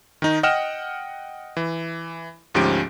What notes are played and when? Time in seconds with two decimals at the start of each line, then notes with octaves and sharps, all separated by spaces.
0.22 D#3 D#4
0.43 D#5 F#5 G5 F6 E7
1.57 E3
2.55 D2 G#2 F3 C#4 G4 D7